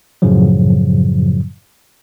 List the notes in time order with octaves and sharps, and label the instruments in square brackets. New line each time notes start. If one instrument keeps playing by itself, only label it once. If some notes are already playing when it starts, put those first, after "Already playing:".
[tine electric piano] F#2 A2 C#3 F3 F#3